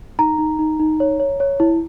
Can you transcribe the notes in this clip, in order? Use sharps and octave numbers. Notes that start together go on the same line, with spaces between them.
D#4 A#5
D#4
D#4
D#4
C#5
C#5
C#5
E4